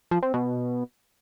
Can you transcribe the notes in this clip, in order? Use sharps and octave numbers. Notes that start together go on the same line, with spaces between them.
F3
C4
B2